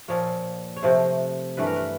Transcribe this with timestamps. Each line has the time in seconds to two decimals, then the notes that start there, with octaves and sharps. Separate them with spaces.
0.08 A#2 F3 A#3 C#5
0.76 C#5
0.83 C3 F3 A3 C5
1.57 G2 E3 A3 B4
1.67 A#4
1.76 B4